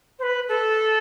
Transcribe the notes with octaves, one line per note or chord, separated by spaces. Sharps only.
C5
B4
A4